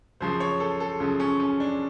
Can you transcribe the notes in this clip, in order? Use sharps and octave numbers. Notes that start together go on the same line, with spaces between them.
F#2 C#3 F3 C5
C#5
A4
A4
F#2 C#3 F3
C#4
C#4
D4